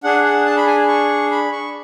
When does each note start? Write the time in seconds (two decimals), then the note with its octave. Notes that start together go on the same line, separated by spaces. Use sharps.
0.04 D4 G#4 F#5
0.25 F#5
0.46 A5
0.57 B5
0.67 G#5
0.88 C#6
1.31 B5
1.52 C#6